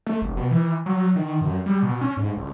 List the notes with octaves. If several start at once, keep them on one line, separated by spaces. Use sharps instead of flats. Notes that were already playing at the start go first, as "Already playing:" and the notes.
A3
F1
B2
E3
F#3
D#3
F#2
G3
B2
C#4
G#2
C#2